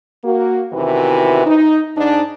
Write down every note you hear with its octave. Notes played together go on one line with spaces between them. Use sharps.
A#3 F#4
E2 C3 D#3 E3 F#4 B4
D#4
G#2 D4 D#4